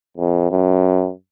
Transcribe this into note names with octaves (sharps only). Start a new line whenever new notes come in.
F2
F#2